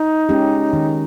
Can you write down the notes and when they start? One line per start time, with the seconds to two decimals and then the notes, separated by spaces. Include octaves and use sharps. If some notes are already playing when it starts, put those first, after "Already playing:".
Already playing: D#4
0.29 G#3 C#4 G4
0.73 D#3